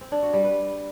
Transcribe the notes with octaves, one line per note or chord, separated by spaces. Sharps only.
C4
D4
F#4
G3
B4